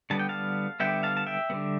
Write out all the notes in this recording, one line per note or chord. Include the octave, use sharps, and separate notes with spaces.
D3 G3 B3 A5
G5
F5 A5
D3 G3 B3 E5 G5
F5 A5
A5
E5 G5
D3 G3 B3